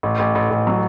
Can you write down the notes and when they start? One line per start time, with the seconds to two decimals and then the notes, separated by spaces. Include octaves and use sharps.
0.03 A1
0.19 A1
0.35 A1
0.51 A1
0.67 F#3